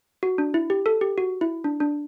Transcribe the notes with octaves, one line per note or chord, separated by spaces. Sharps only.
F#4
D4
E4
G4
A4
G4
F#4
E4
D4
D4